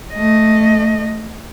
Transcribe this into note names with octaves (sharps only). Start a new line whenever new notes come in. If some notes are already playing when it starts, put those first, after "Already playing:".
A3 D#5